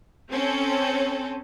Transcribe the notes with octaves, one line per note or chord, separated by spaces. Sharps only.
C4 C#4 A4